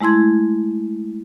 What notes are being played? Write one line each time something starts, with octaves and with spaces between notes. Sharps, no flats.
G#3 A3 E4 C6 G#6